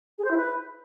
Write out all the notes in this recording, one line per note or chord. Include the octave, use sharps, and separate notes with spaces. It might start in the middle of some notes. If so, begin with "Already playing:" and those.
G#4
C5
E4
B4